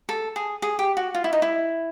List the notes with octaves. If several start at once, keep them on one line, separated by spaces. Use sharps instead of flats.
A4
G#4
G#4
G4
F#4
F4
E4
D#4
E4